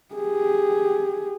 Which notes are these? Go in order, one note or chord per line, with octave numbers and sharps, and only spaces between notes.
G4 G#4